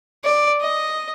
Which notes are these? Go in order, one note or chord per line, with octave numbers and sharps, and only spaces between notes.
D5
D#5